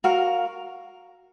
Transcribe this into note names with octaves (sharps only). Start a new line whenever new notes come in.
F#4 A#4 F5